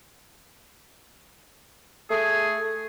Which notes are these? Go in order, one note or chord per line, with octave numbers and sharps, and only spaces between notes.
A3 G#4